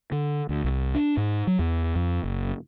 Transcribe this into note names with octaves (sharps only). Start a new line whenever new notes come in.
D3
D2
C2
D4
G#2
F#3
E2
F2
F#1